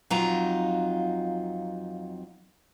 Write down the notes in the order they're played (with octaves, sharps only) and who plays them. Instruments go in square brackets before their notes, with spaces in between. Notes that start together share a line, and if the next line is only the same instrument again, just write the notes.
[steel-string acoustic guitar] F2 F#3 D#4 F4 A#5